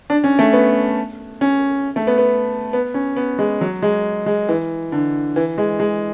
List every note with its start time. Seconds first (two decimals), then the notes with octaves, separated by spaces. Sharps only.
0.10 D4
0.24 C#4
0.39 A3
0.53 B3
1.41 C#4
1.96 A3
2.07 B3
2.18 B3
2.73 B3
2.94 C#4
3.16 B3
3.39 G#3
3.61 F#3
3.83 G#3
4.26 G#3
4.49 E3
4.92 D3
5.36 E3
5.58 G#3
5.80 G#3